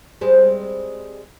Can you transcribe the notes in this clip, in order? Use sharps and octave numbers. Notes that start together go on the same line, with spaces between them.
G3 G#3 C4